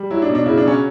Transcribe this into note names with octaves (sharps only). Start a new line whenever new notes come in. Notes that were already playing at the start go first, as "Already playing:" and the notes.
Already playing: G3
F#3 E4
D4
B2
D4
C#3 E4
D4
F#3 C#4